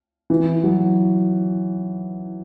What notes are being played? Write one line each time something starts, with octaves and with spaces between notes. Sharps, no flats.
E3
F#3